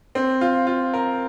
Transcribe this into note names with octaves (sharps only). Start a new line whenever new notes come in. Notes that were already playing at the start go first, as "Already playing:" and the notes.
C4
F4
F4
A#4